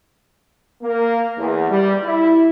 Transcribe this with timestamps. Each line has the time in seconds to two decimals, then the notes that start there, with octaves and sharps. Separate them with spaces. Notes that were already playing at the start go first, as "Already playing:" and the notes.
0.83 A#3
1.38 E2
1.70 G3
2.04 E4